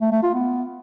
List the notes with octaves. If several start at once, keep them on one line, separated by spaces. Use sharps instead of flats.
A3
A3
F4
B3